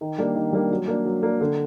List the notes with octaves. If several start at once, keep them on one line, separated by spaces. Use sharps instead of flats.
D#3
G3 A#3 D4
D#3
G3 A#3 D4
F#3
A#3 D4
F#3
A#3 D4
D3